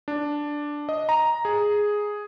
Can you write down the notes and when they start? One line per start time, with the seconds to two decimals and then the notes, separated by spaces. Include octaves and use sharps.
0.08 D4
0.89 D#5
1.09 A#5
1.45 G#4